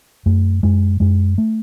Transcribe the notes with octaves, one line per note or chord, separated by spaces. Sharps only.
F#2 A3
F#2 G#3
F#2 G#3
A3